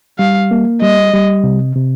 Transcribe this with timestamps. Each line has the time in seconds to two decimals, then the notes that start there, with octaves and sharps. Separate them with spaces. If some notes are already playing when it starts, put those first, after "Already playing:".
0.19 G3 F5
0.51 A#3
0.82 G3 D#5
1.14 G3
1.44 C3
1.76 C3